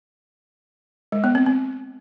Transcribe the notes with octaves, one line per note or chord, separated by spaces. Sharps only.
G#3
B3
C4
C4